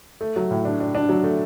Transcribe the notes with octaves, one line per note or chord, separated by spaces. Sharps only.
A3
F#3
A2
D4
D4
D4
F#3
A3